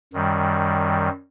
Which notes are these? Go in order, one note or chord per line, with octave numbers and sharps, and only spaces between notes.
F#2 D#3 G3